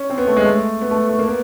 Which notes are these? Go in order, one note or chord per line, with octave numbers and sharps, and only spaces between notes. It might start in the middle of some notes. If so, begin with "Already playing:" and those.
Already playing: C#4
C4
B3
A3
G#3
A3
B3
A3
A3
A#3
B3